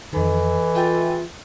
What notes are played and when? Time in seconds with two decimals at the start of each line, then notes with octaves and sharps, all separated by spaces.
0.13 F2 D#3 E3 A4 D#5
0.75 F4 G#4 E5 G5